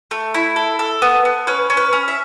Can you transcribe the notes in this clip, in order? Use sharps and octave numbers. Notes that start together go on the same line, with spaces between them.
A3
E4
A4
A4
B3
B3
C#4 B4
C#4
B4
C#4
E5